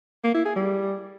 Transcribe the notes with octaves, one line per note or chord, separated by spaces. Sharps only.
A#3
E4
G#4
G3